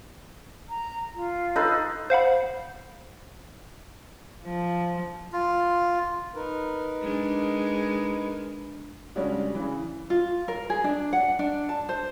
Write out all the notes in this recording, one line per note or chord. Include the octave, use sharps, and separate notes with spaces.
A#5
F4
D#4 A4 B4
C5 F5 F#5 B5
F3
F4
D#4 A#4 B4
G#3 D4
C#3 G3 G#3 C#4 D4 F#4
C#3 E3
F4
A#4
G#4
D4
F#5
D4
A5
C5